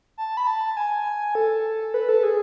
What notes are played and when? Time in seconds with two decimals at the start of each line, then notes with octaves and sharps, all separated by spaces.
0.18 A5
0.37 B5
0.47 A5
0.77 G#5
1.35 A4
1.94 B4
2.09 A4
2.23 G#4